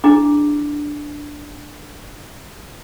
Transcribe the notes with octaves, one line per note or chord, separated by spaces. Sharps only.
D4 E4 G#4 D6